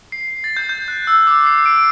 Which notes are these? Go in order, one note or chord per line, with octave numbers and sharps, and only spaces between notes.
C7
A6
G6
G6
F#6
E6
D6
C7
C7
D7